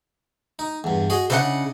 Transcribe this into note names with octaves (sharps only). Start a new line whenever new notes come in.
D#4
E2 G2
F#4 G#4 D#5
C#3 D4 E4 C5 D#5 F#5